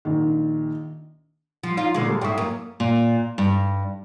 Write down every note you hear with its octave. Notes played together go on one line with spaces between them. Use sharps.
A#1 D#3
F3
D#4 F4
D2 A#2 D3 G#3 C6
G3 A4
G#2 E4 G5 C#6 D#6
F#2 A#3
A#2
G2